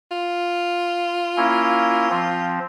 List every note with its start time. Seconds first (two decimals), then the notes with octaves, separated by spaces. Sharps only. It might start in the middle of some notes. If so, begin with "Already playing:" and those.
0.11 F4
1.37 A#3 C#4 E4
2.10 F3 C4